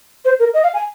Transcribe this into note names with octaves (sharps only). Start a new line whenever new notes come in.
C5
A#4
D#5
F5
G#5